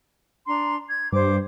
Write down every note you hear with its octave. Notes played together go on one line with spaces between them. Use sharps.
D4 A#5 C6
G#6
G2 C5 D6